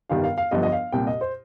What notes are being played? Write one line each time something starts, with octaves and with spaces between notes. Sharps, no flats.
G1 G2 D#3 G3 F5
F5
F5
G1 G2 F3 D#5
D#5
F5
C2 A#2 G3 G5
D#5
C5